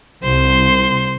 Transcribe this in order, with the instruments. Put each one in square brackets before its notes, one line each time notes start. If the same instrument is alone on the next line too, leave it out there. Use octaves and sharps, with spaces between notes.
[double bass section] C2 [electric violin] C5 C6